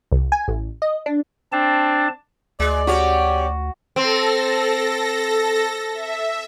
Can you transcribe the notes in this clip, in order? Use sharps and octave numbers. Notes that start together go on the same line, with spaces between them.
C2
G#5
A1
D#5
D4
C4 D4 A5
D2 G#3 D5
C#4 F#4 G4 C#5
C4 A4 A#6
E5